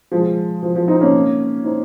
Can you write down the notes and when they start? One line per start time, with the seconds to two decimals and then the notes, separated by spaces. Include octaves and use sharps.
0.12 F3 G#3
0.63 F3
0.75 F3
0.88 C4 D#4
1.01 A#3 C#4
1.64 C4 D#4